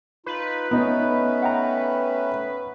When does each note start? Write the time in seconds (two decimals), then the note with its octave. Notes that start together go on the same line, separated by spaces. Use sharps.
0.26 D#4 F4 B4
0.71 A3 B3 C#4 D#4
1.43 F#5 G5 A#5